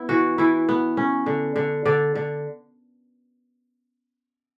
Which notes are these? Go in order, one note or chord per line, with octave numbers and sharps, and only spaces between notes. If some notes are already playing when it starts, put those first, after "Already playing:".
Already playing: B3 E4
E3 F#4
E3 E4
B3
C#4
D3
D3
D3 D5
D3